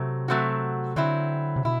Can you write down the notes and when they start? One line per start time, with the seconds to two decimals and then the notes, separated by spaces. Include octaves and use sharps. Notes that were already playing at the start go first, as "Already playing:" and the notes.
Already playing: C3 F#3 A3 C4
0.28 F#3 A3 C4 F#4
0.96 D3 F#3 C4 E4
1.56 C3
1.65 B2 E4